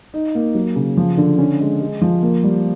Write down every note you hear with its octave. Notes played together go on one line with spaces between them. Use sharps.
D#4
A#3
F#3
C#3
F3
D3
C#4
G#3
G#3
F3
A#3
G3